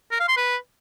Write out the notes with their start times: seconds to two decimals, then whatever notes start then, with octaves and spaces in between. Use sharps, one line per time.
0.11 A#4
0.20 F5
0.28 C6
0.37 B4